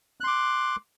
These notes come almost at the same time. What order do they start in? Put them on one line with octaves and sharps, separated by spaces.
F#6 C6 D6